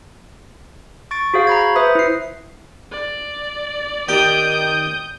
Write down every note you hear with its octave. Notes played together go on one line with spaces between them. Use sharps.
C#6 A6 D7
F#4 G#4 C5 F5
A#5 B5 G#6
B4 C5 E5 D#6
E4 C7
D5
D#3 G4 A#4 G5 D#6 G6